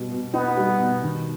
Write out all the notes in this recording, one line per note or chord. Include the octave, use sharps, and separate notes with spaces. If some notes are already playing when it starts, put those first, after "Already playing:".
Already playing: B2 G3
B2
B3 D#4
G3
B2
D#3